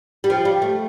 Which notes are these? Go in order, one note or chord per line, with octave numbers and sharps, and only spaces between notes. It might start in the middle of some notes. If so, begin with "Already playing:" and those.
G3
F3
G3
A3